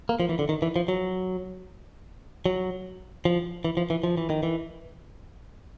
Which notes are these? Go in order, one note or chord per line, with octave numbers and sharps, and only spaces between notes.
A#3
F3
E3
D3
D#3
E3
F3
F#3
F#3
F3
E3
F3
E3
F3
E3
D#3
E3